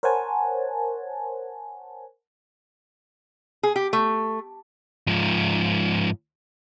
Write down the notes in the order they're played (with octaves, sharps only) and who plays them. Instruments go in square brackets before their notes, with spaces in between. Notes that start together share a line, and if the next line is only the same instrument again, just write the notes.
[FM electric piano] A#4 C5 C#5 F#5 G#5 A5
[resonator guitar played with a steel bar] G#4
G4
A3
[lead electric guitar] G#2 F3